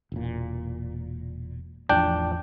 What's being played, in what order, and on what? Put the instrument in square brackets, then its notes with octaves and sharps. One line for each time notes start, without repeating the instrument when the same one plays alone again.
[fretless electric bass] E1 A#2
[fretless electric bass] A1 E2 F3 [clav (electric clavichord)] D4 G5